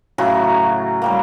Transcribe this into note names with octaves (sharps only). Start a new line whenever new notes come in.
A2 C#3 F#3 F#4
F#3 G3 A#3